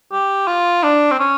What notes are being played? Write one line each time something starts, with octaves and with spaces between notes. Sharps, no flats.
G4
F4
D4
C4
C#4